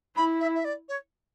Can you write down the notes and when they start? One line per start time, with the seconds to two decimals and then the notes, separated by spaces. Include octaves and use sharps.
0.16 E4 B5
0.40 E5
0.55 E5
0.64 D5
0.88 C#5